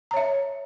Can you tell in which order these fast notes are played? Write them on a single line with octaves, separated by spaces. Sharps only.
A#5 C#5 E5